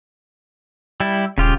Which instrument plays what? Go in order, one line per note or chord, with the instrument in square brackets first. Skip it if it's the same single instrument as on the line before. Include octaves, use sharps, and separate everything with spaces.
[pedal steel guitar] G3 E4
[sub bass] D#1 [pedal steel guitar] C#3 F4 G4